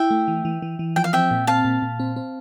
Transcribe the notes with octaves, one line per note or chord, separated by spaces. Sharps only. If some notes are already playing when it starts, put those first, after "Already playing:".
Already playing: E4 E5 G5
A3
E3
E3
E3
E3
F3 G5
F5
C4 E5 G5
A#2
C4 F5 A5
A#2
A#2
C4
C4